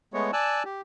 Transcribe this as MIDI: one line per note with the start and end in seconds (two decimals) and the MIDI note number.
0.14 0.31 56
0.14 0.31 57
0.14 0.31 59
0.14 0.31 73
0.33 0.63 74
0.33 0.63 80
0.33 0.63 81
0.33 0.63 88
0.33 0.63 90
0.65 0.81 67